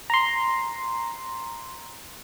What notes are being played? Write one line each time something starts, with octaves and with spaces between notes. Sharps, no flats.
A#5 C6